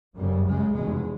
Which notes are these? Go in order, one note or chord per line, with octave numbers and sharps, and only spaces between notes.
G1 F#2 C#3 G3
C#2 C#3 G#3
F1 E2 B2 G#3